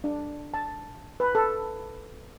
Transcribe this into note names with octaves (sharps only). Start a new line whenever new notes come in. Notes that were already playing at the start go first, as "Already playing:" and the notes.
D4
A5
B4
A4